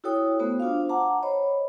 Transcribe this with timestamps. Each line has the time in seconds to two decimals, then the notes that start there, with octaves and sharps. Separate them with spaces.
0.04 E4 F#4 A4 C#5 G5 D#6
0.39 A3 B3 F#4 C5
0.60 D4 F4 C5 F5
0.89 F#5 A5 A#5 D6
1.22 C5 C#5 D#5 B5